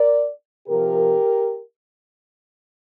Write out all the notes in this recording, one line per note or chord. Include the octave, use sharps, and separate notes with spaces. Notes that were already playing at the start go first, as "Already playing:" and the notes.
Already playing: A#4 D5
C3 F3 G4 A#4